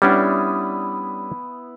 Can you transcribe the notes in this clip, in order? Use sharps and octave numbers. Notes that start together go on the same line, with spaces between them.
G3 B3 C#4 D4 E4